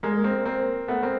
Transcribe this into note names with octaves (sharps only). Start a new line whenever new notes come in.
G#3 A#3
A#3 C4
A#3 C4
A3 B3
A#3 C4